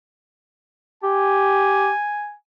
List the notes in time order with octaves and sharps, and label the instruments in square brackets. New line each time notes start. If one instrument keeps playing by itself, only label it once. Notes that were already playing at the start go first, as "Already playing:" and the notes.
[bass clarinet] G4 [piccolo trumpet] G#5